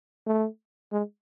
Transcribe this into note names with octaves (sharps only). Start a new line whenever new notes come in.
A3
G#3